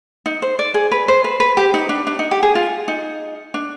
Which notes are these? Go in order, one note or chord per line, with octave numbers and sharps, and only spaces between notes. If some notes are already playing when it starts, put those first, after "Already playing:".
D#4
C5
D5
G#4
B4
C5
B4
B4
G4
D#4
D4
D4
D#4
G4
G#4
F4
D#4
D4